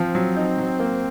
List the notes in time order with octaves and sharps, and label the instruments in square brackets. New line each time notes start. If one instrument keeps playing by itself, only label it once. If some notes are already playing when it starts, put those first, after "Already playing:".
Already playing: [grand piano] F3 [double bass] C4
[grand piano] F#3
D#4
F#3
A#3